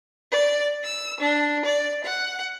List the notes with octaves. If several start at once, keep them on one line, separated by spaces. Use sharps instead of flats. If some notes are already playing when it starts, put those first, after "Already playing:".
D5
E6
D4
D5
F#5